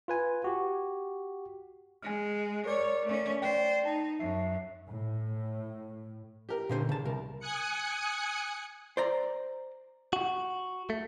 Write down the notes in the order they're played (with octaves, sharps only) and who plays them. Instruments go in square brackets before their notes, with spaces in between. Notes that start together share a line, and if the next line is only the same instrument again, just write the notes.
[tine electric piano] F4 B4 G#5
F#4 G4
[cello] G#3 [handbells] G#5 F6
[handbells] A#4 D5 D6 [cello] C#5
[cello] A3 C#4
[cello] C5 [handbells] D5 G5
[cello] D#4 [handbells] A5
[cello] F#2 [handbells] E5 C7
[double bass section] A2
[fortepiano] G4 A#4
[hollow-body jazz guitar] A#2 D3 C5
C#3 A5
[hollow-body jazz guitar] C2 [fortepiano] A#4
[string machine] G#5 D#6 F#6 C#7
[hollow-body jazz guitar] C5 D5 A#5
[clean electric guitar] F#4
A3